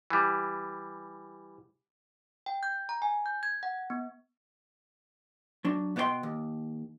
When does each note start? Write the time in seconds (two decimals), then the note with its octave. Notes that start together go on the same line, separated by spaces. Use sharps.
0.10 E3 G3
2.46 G5
2.63 G6
2.89 A#5
3.02 G#5
3.26 G6
3.43 G#6
3.63 F#5
3.90 B3
5.65 F#3 D4
5.96 B2 B3 C5 D5 G5 C6
6.23 D#2